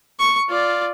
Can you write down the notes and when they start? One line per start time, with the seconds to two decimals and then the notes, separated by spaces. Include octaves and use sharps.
0.19 C#6
0.49 F4 D5